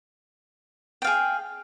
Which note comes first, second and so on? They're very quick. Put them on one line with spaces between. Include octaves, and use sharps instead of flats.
G5 F5 G#4